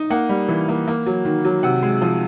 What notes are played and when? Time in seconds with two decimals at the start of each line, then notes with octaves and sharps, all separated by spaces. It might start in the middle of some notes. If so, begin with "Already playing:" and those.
Already playing: D#4
0.10 A#3 F#5
0.29 G3
0.49 E3
0.69 A#3
0.88 A#3
1.06 F#3
1.25 D#3
1.45 F#3
1.63 C3 F#5
1.83 G#3
2.02 F3